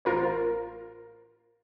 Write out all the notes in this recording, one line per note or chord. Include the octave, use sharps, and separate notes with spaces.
A1 F4 A#4 C5